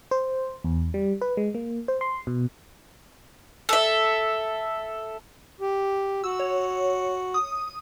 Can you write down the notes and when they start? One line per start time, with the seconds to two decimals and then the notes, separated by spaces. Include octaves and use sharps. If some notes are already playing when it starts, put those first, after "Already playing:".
0.11 C5
0.64 E2
0.94 G3
1.22 B4
1.37 G#3
1.55 A#3
1.88 C5
2.01 C6
2.27 B2
3.69 A4 E5
5.61 G4
6.24 F#4 E6
6.40 C#5
7.34 D#6